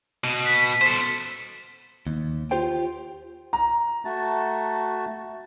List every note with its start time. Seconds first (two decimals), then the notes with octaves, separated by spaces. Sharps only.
0.24 B2
0.46 B6
0.81 A4 C5
2.07 D#2
2.51 F4 G4 C5 G5
3.53 A#5
4.05 A3 F#4 A5